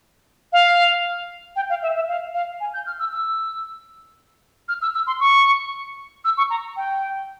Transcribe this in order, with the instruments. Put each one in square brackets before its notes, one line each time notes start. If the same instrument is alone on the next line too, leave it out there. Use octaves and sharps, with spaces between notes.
[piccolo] F5
G5
F5
E5
E5
F5
F5
G#5
G6
F6
E6
E6
F6
E6
E6
C6
C#6
E6
C#6
A#5
G5